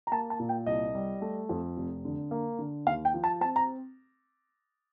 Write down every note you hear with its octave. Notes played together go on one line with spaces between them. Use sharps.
A#5
A#3 A5
A5
A#2
G5
C2 D#5
G3
A3
F2
F1
D3
A#3
D3
D#2 F5
G5
F3
A5
C4 A5
A#5